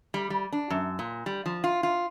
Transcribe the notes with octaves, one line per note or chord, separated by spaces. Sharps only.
G3
G3
D4
F#2
A#2
G3
F3
F4
F4